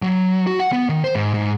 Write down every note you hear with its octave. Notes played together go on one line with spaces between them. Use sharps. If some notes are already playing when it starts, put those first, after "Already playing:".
F#3
F#4
F#5
B3
D#3
C5
G#2
G#2